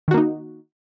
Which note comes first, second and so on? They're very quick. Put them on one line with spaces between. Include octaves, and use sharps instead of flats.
D#3 F#4 A#3 D#4